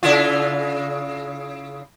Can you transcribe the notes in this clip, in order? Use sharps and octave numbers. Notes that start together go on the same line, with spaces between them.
C#3 E4 F4